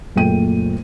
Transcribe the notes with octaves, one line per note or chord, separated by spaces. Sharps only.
F#1 A#2 A3 G5 D#7